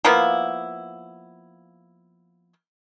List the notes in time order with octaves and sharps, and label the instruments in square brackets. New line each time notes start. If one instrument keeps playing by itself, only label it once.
[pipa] F3 A#3 B3 E4